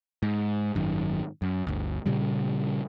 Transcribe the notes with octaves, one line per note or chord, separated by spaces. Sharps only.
G#2
G#1 F#2 D#3
F#2
G1 D2
A#2 C#3 G3